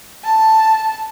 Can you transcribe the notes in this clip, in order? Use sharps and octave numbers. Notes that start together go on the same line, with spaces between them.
A5